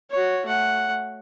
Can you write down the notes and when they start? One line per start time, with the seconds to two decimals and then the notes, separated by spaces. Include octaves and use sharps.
0.11 F#4 C#5
0.46 A3 F#5